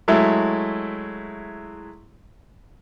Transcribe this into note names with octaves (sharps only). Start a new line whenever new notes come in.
F#3 G#3 A3 E4